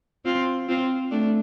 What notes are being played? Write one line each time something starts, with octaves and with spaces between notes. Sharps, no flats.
C4 F4
C4 F4
A3 D4